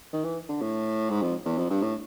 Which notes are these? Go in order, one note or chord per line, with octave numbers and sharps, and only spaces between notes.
D#3
E3
D3
A2
G#2
F2
E2
F2
G2
A2